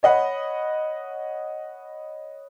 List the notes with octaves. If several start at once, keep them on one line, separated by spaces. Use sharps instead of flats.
C#5 D#5 F#5 B5